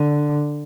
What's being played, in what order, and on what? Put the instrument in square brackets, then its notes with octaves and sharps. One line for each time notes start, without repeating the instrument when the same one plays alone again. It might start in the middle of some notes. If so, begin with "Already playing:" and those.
Already playing: [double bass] D3